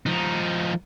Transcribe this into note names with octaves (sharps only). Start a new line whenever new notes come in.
F3 D#4